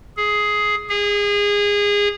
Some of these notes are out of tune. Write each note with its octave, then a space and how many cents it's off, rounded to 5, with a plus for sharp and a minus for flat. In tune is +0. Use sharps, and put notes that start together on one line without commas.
G#4 +10
G#4 -25